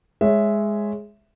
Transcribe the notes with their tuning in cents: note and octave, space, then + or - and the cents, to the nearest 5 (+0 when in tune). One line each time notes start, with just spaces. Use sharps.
G#3 +0 C#5 +0 E5 +0